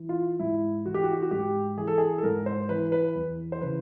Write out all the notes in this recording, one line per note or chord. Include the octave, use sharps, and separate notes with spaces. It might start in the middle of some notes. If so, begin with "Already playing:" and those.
Already playing: E3
F4
G#2 E4
E3 F#4
G4
F#4
G4
F#4
G#2 G4
E3 G#4
A4
G#4
A4
G#2 A#4
C5
E3 B4
B4
E2
C5
C#3 E3 B4